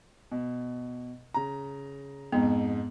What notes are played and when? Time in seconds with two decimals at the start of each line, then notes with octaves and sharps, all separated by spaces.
0.32 B2
1.34 C#3 A#5
2.32 F2 G#2 B3